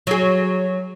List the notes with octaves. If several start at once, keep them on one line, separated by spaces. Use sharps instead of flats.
F#3 G#4